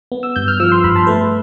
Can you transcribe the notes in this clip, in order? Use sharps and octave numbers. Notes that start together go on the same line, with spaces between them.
B3
E6
G2 G6
F6
F3 E6
C6
G2 B5
A5
A3 B4